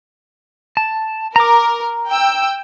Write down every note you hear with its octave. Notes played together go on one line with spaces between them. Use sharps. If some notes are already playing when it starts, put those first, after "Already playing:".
A5
A#4 A#5 D6
G5 E6